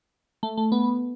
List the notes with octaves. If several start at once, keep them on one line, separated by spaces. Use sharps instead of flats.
A3
A3
B3